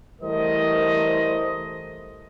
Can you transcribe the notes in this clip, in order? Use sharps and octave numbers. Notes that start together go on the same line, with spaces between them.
E3 G3 A3 A#4 C5 D#5